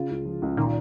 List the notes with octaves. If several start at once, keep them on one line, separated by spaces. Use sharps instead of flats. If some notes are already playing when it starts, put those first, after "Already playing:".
Already playing: C#3 F4
C#2
F3
C#2
A#2 D#3